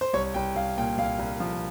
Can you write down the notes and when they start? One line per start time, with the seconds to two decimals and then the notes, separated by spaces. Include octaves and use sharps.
0.01 C5
0.13 C2 C#5
0.34 C2 G5
0.55 C2 F5
0.78 A#2 G5
0.98 C2 F5
1.19 C2
1.40 F3